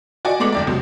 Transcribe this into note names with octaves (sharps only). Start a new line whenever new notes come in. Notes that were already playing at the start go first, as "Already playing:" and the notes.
F#4 D5 D#5 G#5
G#3 A3 B3 D6 F#7
G1 F2 D5
C#2 C3 F#3